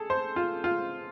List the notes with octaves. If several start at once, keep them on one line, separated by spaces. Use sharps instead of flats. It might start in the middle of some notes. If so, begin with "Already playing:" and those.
Already playing: G#4 A4
C5
F4
F4